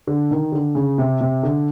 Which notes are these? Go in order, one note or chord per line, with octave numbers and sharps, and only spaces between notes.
D3
D#3
D3
C#3
C3
C3
D3